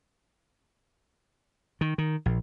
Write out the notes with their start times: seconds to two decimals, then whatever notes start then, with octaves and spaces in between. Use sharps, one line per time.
1.81 D#3
1.98 D#3
2.26 A#1